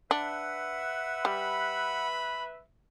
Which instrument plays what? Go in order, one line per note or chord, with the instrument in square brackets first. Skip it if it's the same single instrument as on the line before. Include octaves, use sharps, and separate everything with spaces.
[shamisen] D4 [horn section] B4 E5 [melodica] F#5
[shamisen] G3 [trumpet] B5